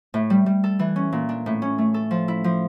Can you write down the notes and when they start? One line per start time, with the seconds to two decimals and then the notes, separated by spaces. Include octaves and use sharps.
0.14 A2
0.30 G3
0.46 G3
0.64 A4
0.79 E3
0.96 C#4
1.12 A#2
1.29 D4
1.46 A2
1.62 C#4
1.78 A3
1.94 A4
2.11 F3
2.28 E4
2.44 F3